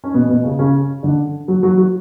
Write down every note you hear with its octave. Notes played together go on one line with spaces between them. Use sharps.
C#4
B2 B3
B2 B3
C#3 C#4
C#3 C#4
D3 D4
F#3 F#4
F#3 F#4
F#3 F#4